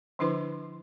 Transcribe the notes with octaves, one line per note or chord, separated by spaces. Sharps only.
D3 F3 D4 E4 B4 C6